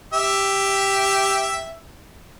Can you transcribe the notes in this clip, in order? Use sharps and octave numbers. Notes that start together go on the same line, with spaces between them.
G4 E5